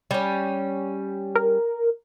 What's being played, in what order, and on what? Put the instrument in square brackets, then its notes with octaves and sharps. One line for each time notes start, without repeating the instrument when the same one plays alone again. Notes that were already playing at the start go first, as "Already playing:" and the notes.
[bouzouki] G3 C#4
[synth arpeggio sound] A#4